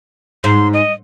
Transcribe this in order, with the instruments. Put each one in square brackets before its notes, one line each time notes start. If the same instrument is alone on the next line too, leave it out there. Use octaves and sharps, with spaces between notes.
[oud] G#2 [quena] C6
[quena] D#5